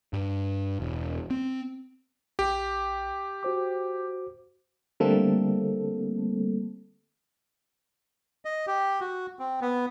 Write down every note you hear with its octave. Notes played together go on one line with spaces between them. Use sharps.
G2
E1
C4
A#1 G4
F#4 C5 D6
D3 G3 A3 A#3 C4 A4
D#5
G4
F#4
C4
B3